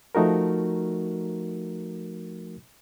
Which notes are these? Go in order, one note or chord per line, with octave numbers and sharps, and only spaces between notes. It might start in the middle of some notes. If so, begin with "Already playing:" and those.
F3 A3 D#4 F#4 A#4